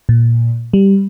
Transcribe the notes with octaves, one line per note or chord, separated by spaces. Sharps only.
A#2
G3